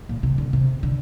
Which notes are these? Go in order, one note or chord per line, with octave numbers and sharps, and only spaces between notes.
A#2
C3
D3
C3
D3